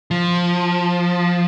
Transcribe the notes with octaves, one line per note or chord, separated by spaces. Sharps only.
F3